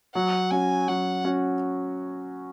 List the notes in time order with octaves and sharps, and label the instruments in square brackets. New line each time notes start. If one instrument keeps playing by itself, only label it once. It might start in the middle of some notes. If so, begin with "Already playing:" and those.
[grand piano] F#3 [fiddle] F#5
[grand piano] C#4 F#4 [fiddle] G#5
[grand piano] F#3 [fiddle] F#5
[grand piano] C#4 F#4